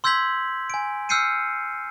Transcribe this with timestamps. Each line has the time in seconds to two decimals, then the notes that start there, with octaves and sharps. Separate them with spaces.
0.04 C6 E6 G6 G#6 B6 F#7
0.70 G#5 D7
1.09 E6 F6 G6 C7 C#7 D#7